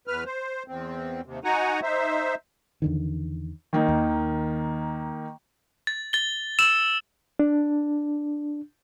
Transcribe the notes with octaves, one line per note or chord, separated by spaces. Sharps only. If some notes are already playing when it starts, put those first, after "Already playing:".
E2 B4 F6
C5
E2 C4
D#2 C3
D#4 F#4 F#5 G#5 A#5
D#4 C5 E5
E2 D3 D#3
D#3 A#3 D#4
D#2
A6
A6 G7
E6 E7
D4